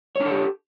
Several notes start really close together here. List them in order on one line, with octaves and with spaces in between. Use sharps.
C#5 D4 A4 G4